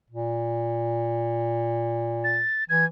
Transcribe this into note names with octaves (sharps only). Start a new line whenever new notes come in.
A#2
A6
E3 G#6